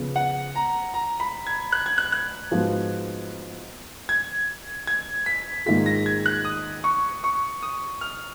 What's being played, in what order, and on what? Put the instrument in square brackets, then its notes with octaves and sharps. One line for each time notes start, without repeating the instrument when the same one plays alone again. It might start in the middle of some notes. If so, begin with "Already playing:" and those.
Already playing: [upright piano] C#3 F3 B3
[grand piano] F#5
A#5
A#5
B5
G#6
F#6
G#6
F#6
F#6
[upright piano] G#2 F3 B3 F#4
[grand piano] G#6
G#6
B6
[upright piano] G#2 D#3 A#3 F4 G#4 [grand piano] B6
[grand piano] A#6
G#6
F#6
D#6
C#6
C#6
D#6
F6